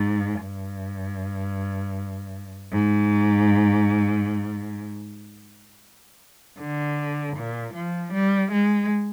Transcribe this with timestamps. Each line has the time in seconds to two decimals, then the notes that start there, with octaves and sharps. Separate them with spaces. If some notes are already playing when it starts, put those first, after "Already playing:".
Already playing: G#2
0.41 G2
2.72 G#2
6.59 D3
7.37 A#2
7.75 F3
8.13 G3
8.52 G#3